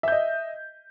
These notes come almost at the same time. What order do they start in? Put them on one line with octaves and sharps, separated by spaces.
E5 G6 D#5